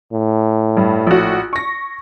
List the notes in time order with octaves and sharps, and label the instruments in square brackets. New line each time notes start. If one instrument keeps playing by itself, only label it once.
[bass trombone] A2
[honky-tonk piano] G2
A#1 F#4
C#6 A#6